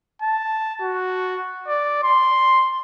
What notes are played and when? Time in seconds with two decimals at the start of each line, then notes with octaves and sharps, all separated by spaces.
0.22 A5
0.81 F#4
1.68 D5
2.03 C6